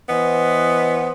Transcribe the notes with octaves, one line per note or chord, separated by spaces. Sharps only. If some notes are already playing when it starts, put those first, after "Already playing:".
E3 B3 C5 D#5